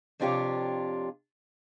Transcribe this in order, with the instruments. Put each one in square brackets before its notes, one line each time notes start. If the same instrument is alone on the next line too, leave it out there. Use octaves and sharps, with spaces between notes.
[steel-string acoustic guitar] F2 C3 D4 F4 G4 C#5